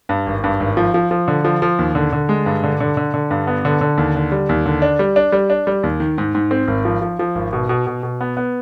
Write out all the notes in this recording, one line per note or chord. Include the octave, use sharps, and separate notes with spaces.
G2
G#1
G2
G#1
F3
F3
F3
D3
F3
F3
D#2
D3
D3
G#3
G2
D3
D3
D3
D3
G2
B3
D3
D3
D#2
D3
G3
D#2
D3
D4
G3
D4
G3
D4
G3
D#2
D#3
G#2
G#2
C4
G#1
F3
F3
F3
G#1
B2
B2
B2
B2
B3
B3